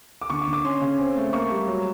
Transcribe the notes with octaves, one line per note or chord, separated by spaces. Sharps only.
D6
D3 C#6
D6
D3
D6
C#4 C6
C#3
C4
A3
A#3 C#6
G3
F#3